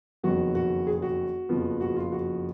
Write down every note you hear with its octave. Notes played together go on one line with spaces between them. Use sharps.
F#1 F2 D#3 F#3 B3 F#4
F#4
G#4
F#4
F#1 F2 F3 B3
F#4
F4
F#4